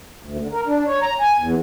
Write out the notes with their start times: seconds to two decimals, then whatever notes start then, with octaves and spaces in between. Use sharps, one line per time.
0.23 D2
0.40 D3
0.52 A#4
0.67 D4
0.87 C#5
1.02 A#5
1.21 G#5
1.39 E2